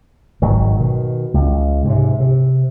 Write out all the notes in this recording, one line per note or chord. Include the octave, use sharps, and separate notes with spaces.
G#1 G#2 D#3 F#3
B2 D#3
C#2
G#2 C3
C3